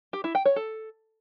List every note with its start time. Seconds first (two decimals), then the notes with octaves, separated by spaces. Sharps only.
0.13 G4
0.24 E4
0.35 G5
0.45 C#5
0.56 A4